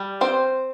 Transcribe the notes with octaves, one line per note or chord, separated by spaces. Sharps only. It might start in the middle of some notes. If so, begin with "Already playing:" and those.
Already playing: G3
C4 C5